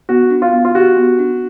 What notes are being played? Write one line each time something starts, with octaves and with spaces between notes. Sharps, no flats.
B3 F#4
D4
F4
B3
F4
F#4 G4
B3
D4